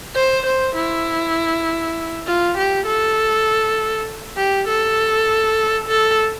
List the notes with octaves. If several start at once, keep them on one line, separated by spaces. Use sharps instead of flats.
C5
C5
E4
F4
G4
A4
G4
A4
A4